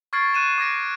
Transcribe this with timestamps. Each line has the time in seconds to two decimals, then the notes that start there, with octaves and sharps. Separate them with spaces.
0.13 C#6 F6 G#6 A6 C7 D7
0.34 F#6 D#7 E7
0.58 D6 G#6 A#6 D7